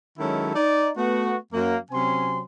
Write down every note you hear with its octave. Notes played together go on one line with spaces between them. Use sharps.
D#3 F#3 G#3 C#4 E4 A4
D#4 D5
A3 B3 F#4
F#2 A#3
C3 F#3 C4 C#4 G#5 C6